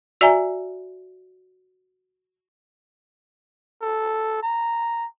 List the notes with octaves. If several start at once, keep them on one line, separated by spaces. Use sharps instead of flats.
F#4 D5 E5 G#5 A#5
A4
A#5